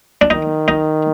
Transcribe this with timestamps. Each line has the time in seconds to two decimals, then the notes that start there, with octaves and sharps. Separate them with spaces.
0.21 D4
0.30 D#3 D#4
0.68 D#4